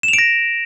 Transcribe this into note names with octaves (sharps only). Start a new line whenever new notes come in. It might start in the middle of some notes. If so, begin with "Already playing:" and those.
E7
F7
D7
A#6